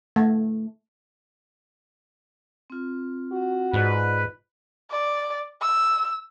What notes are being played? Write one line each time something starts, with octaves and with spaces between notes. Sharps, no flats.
A3
C4 F4
F#4
G#2 F4 B4 D5 D#5
D5
E6